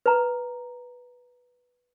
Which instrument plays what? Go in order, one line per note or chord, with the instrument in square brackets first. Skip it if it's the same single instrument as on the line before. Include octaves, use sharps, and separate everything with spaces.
[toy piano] B4 A#5